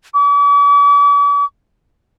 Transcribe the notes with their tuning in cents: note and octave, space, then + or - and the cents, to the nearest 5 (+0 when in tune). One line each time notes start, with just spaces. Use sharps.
D6 -45